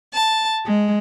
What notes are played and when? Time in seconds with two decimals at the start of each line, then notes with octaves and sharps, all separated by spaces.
0.13 A5
0.66 G#3